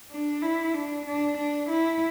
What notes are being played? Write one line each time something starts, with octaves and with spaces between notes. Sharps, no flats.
D4
E4
D4
D4
D4
E4